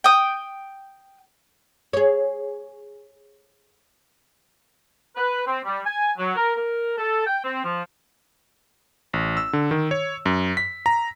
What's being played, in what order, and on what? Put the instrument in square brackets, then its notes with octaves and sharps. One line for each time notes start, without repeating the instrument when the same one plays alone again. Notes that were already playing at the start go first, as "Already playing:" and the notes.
[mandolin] G5 D#6
[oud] G#4 C#5
[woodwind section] B4
C4
G3
G#5
F#3
A#4
A#4
A4
G5
C4
F3
[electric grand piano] A1
E6
D3
D#3
C#5
F#2
B6
A#5